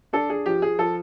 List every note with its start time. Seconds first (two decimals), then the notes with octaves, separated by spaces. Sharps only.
0.13 D4 A4
0.30 G#4
0.46 F3 G4
0.62 G#4
0.79 F3 A4